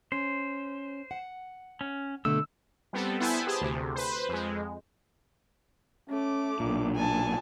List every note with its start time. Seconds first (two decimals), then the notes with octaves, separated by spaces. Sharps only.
0.12 C#4 C5
1.11 F#5
1.81 C#4
2.25 B2 D3 A3 E6
2.93 G3 B3 C4 A4
3.20 B3 E4 C5 G#5 A5 B5
3.47 G4 G#4 C5 A5
3.61 D2 C3
3.96 B4 C5
4.29 F2 G#3
6.10 A3 C#4 D6
6.60 B1 A#2 D4
6.95 G#5 A5